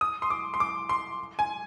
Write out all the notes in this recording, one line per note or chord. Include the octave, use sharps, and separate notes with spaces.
D#6
C6
D6
C6
D6
C6
G#5